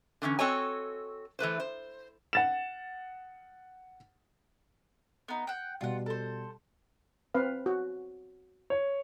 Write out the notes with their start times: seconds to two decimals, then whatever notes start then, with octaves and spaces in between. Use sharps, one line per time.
0.22 D3 E3 A#3 C#4
0.39 C4 F#4 A4 C#5 D#5 G#5
1.39 E3 A3 B4 C5
1.60 C5
2.33 F#5 A6 E7
5.28 B3 D#4
5.47 F#5 G5
5.81 B2 G3 F4 F#5
6.06 A4 C5
7.34 C4 B4 F5
7.66 F#4
8.70 C#5